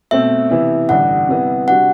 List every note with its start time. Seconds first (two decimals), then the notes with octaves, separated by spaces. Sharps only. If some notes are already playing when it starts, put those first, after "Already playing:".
0.11 B2 A3 C4 E5
0.50 C3 E3 B3 E4
0.89 A1 G2 D3 F#5
1.28 C3 G3 B3 E4 B4
1.68 C3 G3 D4 F#4 F#5